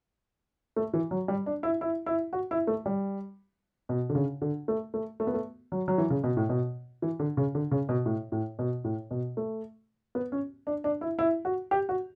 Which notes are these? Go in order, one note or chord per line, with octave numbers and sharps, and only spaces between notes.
A3
E3
F#3
G3
D4
E4
E4
E4
F#4
E4
A3
G3
B2
D3
C#3
D3
A3
A3
A3
B3
A3
F#3
F#3
E3
C#3
B2
A2
B2
E3
D3
C#3
D3
C#3
B2
A2
A2
B2
A2
B2
A3
B3
C#4
D4
D4
E4
E4
F#4
G4
F#4